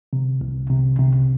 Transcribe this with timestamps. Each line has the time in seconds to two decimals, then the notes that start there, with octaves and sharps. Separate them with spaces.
0.13 C3
0.41 C2
0.70 C3
0.99 C3